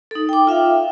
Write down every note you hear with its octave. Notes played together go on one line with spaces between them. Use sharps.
D#4 A4
G5 D6
F4 E5 F5 G5